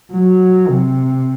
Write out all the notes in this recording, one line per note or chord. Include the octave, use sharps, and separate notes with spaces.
F#3
C3